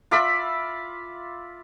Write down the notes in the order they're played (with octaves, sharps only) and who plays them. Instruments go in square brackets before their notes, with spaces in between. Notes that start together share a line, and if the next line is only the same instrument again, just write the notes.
[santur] F4 D5 E5 B5